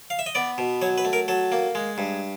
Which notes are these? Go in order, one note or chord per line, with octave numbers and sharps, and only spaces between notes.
F5
E5
D#5
B3 D5
B2
F#3 C#5
B4
A3
A#4
F#3 A4
A#3
G#3
G2